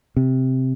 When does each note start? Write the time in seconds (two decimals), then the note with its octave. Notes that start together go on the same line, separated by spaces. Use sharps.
0.17 C3